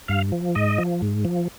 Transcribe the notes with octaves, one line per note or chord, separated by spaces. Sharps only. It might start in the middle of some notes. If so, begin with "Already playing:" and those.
G2 F5
F3
G#2 D#5
F3
G#2
F3